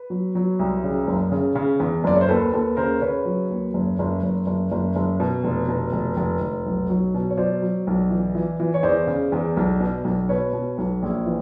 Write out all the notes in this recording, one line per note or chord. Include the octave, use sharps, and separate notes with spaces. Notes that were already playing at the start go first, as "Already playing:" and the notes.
Already playing: B4
F#3
F#3
C2
C#3
F#1
C#3
C#3
E2
F#1 D5
C#5
C5
D#2 A4 B4
D#2 A4 B4
C#3 A#4 C5
C#3 B4 C#5
F#3
D#2
F#1
F#1
F#1
F#1
F#1
F#1
B2
F1
B2
F1
F1
F1
B1
F#3
B2
C#5
F#3 C5 D5
F#3
B1
E3
E3
E3
C#5
E2 C5 D5
C#3
E2
B1
B2
B1
B2 B4 C#5
B2
B1
A#1
E3